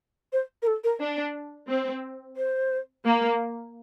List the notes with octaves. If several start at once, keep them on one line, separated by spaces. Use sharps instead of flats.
C5
A#4
A4
A#4
D4
C4
C5
A#3